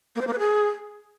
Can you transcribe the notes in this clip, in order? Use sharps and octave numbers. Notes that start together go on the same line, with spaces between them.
A#3
C5
A#3
B4
G#4